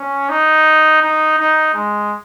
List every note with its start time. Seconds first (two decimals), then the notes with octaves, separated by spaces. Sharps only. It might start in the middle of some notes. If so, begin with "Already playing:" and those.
Already playing: C#4
0.29 D#4
1.01 D#4
1.38 D#4
1.74 G#3